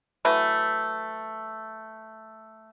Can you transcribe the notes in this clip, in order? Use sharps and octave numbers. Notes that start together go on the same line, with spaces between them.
E3 F#3 A3 B4